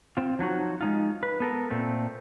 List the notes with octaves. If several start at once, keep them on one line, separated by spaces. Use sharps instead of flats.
C4 F4
F3 F#3 D#4 F#4
G#3 D#4 F4
B4
B3 A4 A#4
A#2 A3 C4